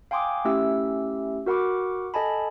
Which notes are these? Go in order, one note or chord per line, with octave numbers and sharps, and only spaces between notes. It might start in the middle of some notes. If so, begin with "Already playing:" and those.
F5 G5 G#5 C6 D6 D#6
A3 C#4 E4 G4 E5 E6
F#4 A#4 F#5 B5 C#6 D6
A4 D#5 G#5 A5 B5